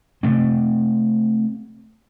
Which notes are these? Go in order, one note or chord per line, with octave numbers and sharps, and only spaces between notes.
C3 A3 C4